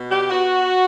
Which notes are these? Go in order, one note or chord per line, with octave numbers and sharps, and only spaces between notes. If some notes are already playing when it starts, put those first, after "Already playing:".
Already playing: B2
G4
B3 F#4